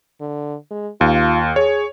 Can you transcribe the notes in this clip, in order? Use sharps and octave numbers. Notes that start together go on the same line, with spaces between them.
D3
G#3
D#2 F4
G#4 C#5